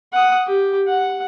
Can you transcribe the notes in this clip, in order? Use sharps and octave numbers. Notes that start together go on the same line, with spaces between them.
F#5 D#6
G4
F#5